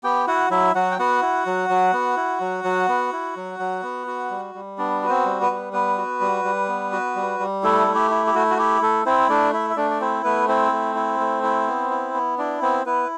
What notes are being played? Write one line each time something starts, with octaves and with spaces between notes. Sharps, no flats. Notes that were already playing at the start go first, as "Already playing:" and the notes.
B3 G4 G5
E4 F#4 F#5
F#3 E4 E5
F#3 F#4 F#5
G5
B3 F#4 F#5
E4
F#3
F#3
B3
E4
F#3
F#3
B3
E4
F#3
F#3
B3
F#4
G3
G3
B3 D4 D5
F#4 B4
C4 C5
G3
B3 B4
G3
B3 B4
F#4
G3
G3
B3
F#4
G3
G3
A3 E4 A4
A3
G4
E4
G4
A3 F#4
F#4
E4 G4
A3 A4
C4 E4 C5
A3 D4 D5
E4 E5
E5
A3 D4 D5
D5
C4 E4 C5
A3 B3 B4
C4 E4 C5
A3
E4
A3
E4
B3
E4
B3
D4 E4 D5
B3 C4 C5
B3 E4 B4